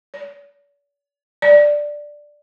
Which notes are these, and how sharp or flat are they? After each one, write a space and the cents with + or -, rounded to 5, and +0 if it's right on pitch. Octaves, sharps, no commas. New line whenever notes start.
D5 -45
D5 +5